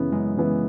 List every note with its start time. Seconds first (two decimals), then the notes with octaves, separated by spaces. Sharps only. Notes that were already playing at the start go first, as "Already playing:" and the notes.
Already playing: F#2 C#3 E3 B3
0.12 F#2 G#3
0.36 C#3 E3 B3